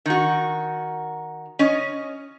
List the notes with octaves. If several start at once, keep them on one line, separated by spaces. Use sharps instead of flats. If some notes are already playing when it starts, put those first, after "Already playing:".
D#3 F#4
C#4 D#5